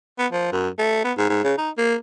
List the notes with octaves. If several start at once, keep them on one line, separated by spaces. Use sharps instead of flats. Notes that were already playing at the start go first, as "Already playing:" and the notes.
B3
F3
F#2
A3
B3
G#2
G#2
C#3
D#4
A#3